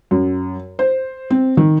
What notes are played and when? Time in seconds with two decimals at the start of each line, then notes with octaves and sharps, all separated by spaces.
0.11 F#2
0.79 C5
1.30 C4
1.57 D#3